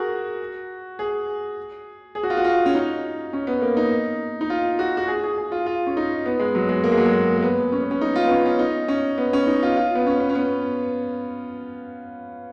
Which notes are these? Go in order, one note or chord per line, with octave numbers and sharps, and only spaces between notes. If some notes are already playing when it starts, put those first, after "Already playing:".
Already playing: F#4 G#4 A#4
G#4
G#4
F#4
F4
F#4
F4
C#4
D#4
C#4
B3
A#3
D#4
D#4
F4
F#4
F#4
G#4
G#4
G#4
F4
F4
C#4
D#4
B3
G#3
F#3
G#3
A#3
G#3
F#3
G#3
A#3
A#3
B3
C#4
B3
C#4
D#4
F4
B3
C#4
C#4
D#4
C#4
B3
C#4
D#4
F4
F4
B3
C#4
B3
C#4
B3